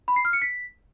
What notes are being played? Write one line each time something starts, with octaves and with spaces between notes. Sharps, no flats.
B5
C7
F6
C#7
B6